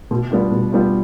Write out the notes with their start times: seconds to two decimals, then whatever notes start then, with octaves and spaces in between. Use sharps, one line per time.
0.11 B2
0.31 G3 B3 D4 F4
0.52 B2
0.72 G3 B3 D4 F4